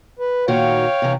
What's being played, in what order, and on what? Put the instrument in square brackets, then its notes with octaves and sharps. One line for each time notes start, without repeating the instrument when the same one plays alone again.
[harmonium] B4
[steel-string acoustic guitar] A#2 D#3 F#4 [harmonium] C#5 F5 G5
[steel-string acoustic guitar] C3 E3